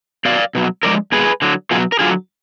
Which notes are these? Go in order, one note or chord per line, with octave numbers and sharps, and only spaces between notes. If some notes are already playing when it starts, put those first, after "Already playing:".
B2 F#3 D5 F5
B2 F#3
D3 F3 G#3 A#4 D5
B2 G#3 G#4 B4
D3 F#3
B2 F#3 F4 G#4
A#4
D3 F#3 F4 G#4